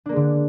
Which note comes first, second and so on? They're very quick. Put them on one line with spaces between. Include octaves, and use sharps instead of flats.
D4 A#3 G#3 D3